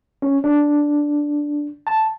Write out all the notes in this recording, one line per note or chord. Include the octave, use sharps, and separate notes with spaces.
C#4
D4
A5